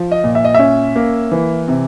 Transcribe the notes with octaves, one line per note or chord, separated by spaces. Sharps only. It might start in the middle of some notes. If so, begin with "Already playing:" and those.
Already playing: F3
D#5
A#2
E5
D#5
C#4 E5
A#3
E3
C3